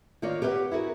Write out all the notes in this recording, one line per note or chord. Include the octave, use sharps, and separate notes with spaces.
D#3 A#3 F4 C#5 D5
G4 B4 C#5 F5 F#5
E4 F#4 G#4 A#4